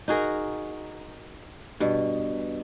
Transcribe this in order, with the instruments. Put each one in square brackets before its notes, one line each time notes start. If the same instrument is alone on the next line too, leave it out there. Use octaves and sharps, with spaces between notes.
[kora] D#4 F#4 G#4 A#4
G2 B2